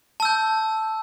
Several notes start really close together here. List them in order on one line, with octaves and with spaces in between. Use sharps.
A5 E6 G6